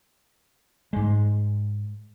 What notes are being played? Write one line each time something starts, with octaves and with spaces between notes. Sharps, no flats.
G#2 G#3